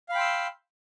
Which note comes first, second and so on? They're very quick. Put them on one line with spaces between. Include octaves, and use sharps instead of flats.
F5 B5 G5 C6 E6